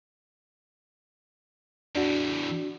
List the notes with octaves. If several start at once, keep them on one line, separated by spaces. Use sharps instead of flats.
E2 A2 D4 F#4